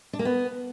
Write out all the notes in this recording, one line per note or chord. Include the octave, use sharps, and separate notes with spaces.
D4
A#3
B3